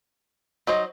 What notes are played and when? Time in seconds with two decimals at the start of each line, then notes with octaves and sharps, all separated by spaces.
0.67 F#3 D#4 C5 D#5